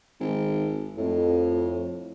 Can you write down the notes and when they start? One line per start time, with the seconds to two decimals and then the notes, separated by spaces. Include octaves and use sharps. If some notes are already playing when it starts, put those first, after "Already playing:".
0.20 G#1
0.97 F2 A2